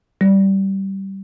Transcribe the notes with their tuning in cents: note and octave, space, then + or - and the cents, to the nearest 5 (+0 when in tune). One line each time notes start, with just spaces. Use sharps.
G3 -15